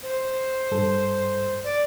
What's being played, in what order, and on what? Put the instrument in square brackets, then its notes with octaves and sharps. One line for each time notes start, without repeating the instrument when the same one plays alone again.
[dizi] C5
[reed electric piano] G2 A4
[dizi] D5